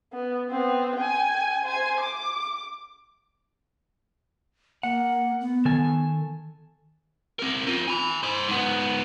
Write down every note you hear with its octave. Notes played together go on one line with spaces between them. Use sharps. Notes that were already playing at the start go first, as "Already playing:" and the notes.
B3
B3 C4
G5 G#5
C5 G#5
D6
A#3 F#5
B3
D#3 A4 G#5
C4 A#4
C4 F4
G#5 B5
C5 D#5
G#2 B3